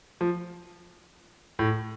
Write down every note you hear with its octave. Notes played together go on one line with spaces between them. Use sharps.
F3
A2